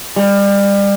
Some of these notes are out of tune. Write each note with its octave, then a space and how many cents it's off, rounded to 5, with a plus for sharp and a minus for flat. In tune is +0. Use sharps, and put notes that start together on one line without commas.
G3 +30